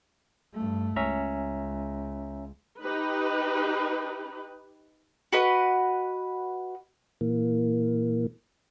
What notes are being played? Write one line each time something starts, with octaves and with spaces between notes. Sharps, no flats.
G2 A3
C#2 C#4 E5 A#5
D#4 G4 B4
F#4 B4 D#5
A#2 E3 A#3